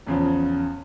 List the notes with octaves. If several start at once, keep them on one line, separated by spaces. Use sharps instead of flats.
E2 C#3 F3